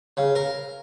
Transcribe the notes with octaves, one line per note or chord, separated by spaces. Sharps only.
C#3
A#4